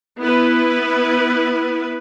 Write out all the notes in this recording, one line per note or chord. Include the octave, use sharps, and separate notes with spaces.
B3 E4 B4